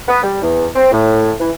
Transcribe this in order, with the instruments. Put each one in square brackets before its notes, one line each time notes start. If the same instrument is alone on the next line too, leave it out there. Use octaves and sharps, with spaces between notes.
[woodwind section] B3
G3
E2
C4
A2
E3